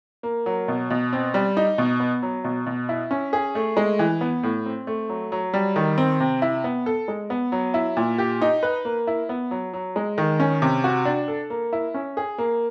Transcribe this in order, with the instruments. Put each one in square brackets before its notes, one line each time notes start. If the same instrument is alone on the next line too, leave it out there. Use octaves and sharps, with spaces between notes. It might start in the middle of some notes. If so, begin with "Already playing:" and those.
[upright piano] A#3
F#3
B2
B2
C4
G3
D#4
B2
B3
F#3
B2
B2
E4
C#4
G#4
A3
G#3
E3
B3
A2
C4
A3
F#3
F#3
G3
D#3
C4
C3
E4
B3
A4
G#3
B3
F#3
E4
A#2
G4
D#4
B4
A#3
E4
B3
F#3
F#3
G#3
D#3
C#4
C3
F#4
D4
A4
A#3
E4
C#4
G#4
A#3